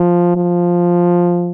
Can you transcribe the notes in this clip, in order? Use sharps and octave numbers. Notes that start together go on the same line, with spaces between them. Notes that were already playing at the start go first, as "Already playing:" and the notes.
Already playing: F3
F3